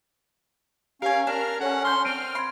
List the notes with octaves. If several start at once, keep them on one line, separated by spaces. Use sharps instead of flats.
C#4 G4 A#4 F5 G#5
D4 A#4 F6
C#4 A4 C#5 F#5
C6 F6 G6
C4 F6 D7 D#7
B5 C6 G#6